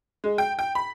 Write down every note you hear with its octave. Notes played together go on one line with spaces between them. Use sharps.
G#3
G5
G5
B5